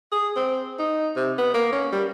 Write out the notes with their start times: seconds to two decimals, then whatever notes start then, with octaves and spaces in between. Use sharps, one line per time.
0.12 G#4
0.36 C4
0.79 D#4
1.16 C3
1.38 B3
1.54 A#3
1.72 C#4
1.92 G3